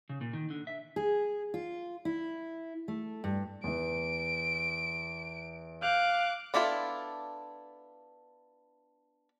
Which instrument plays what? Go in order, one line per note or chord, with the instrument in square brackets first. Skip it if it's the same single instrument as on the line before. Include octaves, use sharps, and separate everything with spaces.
[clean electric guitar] C#3
A#2
D#3
D3
E5
[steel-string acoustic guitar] G#4
F4
E4
A3
G2
[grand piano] E2 E3 [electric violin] D7
[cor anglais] F5 [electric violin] D6 F#6 [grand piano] G6 F7
[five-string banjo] B3 D4 E4 F4 A4